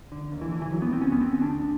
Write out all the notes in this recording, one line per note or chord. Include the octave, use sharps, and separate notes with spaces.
D3
D#2
E3
D3 E3
E3
D#2 F#3
B3
D3 C4
C#4
D#2 B3
C4
D3 C#4
D4
D2